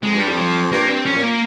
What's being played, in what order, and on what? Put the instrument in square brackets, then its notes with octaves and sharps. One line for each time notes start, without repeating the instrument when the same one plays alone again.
[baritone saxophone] F2 [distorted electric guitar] G#3
[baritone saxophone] G2 [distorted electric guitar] G3
[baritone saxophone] F2
[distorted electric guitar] F3
[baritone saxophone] G2 [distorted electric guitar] A#3
[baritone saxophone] G2 [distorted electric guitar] C4
[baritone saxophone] F2 [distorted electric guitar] C#4
[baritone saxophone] A#2
[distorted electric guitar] A#3